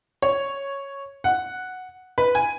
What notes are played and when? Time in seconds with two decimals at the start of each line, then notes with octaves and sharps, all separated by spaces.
0.22 C#5
1.24 F#5
2.18 B4
2.35 G#5